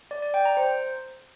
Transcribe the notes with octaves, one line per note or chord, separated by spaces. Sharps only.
D5
D5
G5
A#5
C5